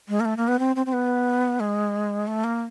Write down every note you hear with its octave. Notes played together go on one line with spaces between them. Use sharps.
G#3
A#3
A3
A#3
B3
C4
C4
C4
B3
G#3
A3
A#3